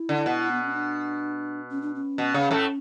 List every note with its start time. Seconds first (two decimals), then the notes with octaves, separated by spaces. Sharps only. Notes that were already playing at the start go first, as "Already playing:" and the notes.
Already playing: E4
0.09 D3
0.26 B2
0.52 B3
0.64 C#4
0.73 D4
1.71 C#4
1.82 D4
1.95 C#4
2.18 B2
2.34 C#3
2.51 A2 A3